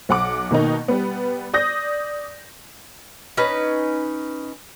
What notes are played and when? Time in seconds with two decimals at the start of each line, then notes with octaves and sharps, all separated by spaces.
0.09 B1 F#5 D6
0.51 B2 D#3 A#3 D#4
0.88 G3 B3
1.53 D5 D#6 G6 A#6
3.37 C#4 D#4 B4